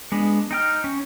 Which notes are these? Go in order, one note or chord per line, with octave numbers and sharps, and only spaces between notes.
G#3 B3 D4
D#4 G5 F6
C#4